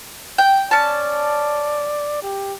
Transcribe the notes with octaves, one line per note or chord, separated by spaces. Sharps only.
G5
C#4 D5 A5
G4